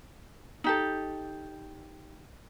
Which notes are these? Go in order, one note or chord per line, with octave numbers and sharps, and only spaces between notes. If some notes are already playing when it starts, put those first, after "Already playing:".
D#4 G4 A4